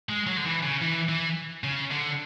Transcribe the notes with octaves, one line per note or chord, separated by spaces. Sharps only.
G#3
F#3
D3
E3
C#3
E3
E3
C#3
D3